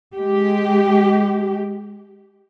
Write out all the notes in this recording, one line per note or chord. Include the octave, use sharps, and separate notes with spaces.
G#3 G4